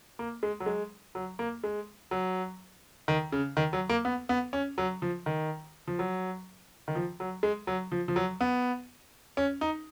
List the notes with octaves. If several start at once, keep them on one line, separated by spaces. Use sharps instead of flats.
A#3
G#3
F#3
G#3
F#3
A#3
G#3
F#3
D#3
C#3
D#3
F#3
A#3
B3
B3
C#4
F#3
F3
D#3
F3
F#3
D#3
F3
F#3
G#3
F#3
F3
F3
F#3
B3
C#4
D#4